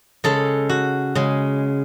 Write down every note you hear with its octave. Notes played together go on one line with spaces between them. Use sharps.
C#3 G#3 A4
F#4
C#3 G#3